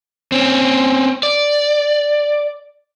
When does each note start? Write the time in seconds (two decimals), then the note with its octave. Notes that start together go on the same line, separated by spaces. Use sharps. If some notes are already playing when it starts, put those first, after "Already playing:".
0.32 C4 C#4
1.23 D5